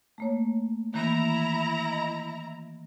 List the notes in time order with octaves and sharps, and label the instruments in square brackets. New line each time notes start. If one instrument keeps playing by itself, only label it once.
[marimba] A3 A#3 C#5
[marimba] D#3 E3 A#3 [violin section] E4 A#5
[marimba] D#5